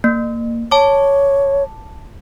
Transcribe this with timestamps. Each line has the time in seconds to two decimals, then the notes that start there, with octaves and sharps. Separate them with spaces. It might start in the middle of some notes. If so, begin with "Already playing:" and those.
0.04 A#3
0.71 C#5 A5 D6